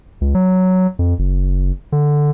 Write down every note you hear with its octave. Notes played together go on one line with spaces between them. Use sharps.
C#2
F#3
F2
F#1
D3